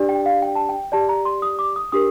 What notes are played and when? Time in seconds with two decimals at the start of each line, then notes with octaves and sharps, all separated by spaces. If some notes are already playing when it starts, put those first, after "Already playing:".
Already playing: D4 G4 D5
0.09 G5
0.26 F5
0.42 G5
0.55 A5
0.69 G5
0.92 G4 D5 A5
1.09 A#5
1.25 C6
1.42 D#6
1.59 D6
1.76 D#6
1.92 D4 G4 A#4 D#6